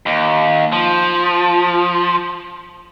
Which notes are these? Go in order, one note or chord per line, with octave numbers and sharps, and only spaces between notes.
D#2
F3